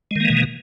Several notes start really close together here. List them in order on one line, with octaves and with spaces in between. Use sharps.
G#3 D#3 A#3 E3 B2